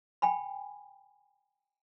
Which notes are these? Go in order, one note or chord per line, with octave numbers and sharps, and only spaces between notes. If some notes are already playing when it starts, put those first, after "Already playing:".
G5 G#5 B5